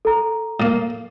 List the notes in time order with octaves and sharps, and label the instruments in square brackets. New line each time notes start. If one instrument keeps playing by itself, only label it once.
[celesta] A4 A#5
[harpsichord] A2 A#3